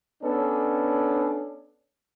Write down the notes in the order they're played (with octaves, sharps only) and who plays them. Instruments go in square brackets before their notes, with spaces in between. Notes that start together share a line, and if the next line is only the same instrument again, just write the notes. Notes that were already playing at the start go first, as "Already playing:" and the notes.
[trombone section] B3 C#4 D4 A4